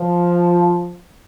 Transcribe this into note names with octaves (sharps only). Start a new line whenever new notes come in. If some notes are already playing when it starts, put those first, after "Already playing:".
Already playing: F3